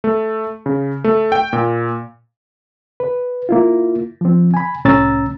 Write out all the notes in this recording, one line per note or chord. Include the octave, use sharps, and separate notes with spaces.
A3
C#3
A3
G5
A#2
B4
A#3 E4 F4
F3 C4
G#5 B5
C2 A2 C#4 A#5 E6 A6